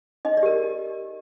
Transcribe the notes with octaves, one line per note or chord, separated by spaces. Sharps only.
D#4 D#5
D5
G4 A#4